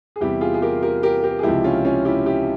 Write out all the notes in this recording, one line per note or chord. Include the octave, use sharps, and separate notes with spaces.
G#4
E2 C3 G3 E4 G4
F4 G#4
G#4
G4 A#4
G4 A#4
G4 A#4
G4 A#4
G#4
C#2 C3 F3 E4 G4
C#4 F4
C#4 F4
E4 G4
E4 G4